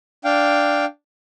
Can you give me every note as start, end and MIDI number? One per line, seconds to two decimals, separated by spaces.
0.24 0.85 62
0.24 0.85 77
0.24 0.85 79